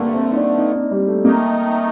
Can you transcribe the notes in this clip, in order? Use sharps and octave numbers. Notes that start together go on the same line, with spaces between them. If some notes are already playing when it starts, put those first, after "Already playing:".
Already playing: G2 D3 A3 A#3
C4
D#4
D4
D#4
D#4
G3
A3
D#3 A3 A#3 D#4